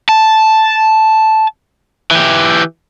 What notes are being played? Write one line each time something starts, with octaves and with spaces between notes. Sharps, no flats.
A5
E3 G4